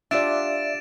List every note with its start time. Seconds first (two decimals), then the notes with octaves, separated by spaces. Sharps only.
0.11 D4 F4 G4 D5 E5 A6 D7 E7